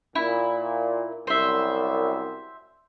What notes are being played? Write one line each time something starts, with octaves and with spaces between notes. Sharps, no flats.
A#2 E4
C2 F#2 C5 E5